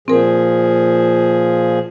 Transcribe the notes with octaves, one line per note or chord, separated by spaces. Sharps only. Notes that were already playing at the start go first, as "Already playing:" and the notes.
A#2 F3 C4 G#4 A#4